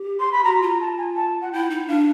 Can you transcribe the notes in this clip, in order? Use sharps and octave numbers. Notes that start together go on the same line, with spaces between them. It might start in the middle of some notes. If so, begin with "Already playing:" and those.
Already playing: G4
C6
B5
F#4 A#5
F4 A#5
A5
G#5
A5
F#5
E4 G5
D#4
D4 F5